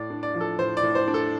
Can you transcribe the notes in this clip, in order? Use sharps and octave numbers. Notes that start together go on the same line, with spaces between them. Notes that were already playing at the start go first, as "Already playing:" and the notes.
Already playing: A2 D5
D4
D5
F3
A4
A2 C5
D5
A2
C5
D4
A4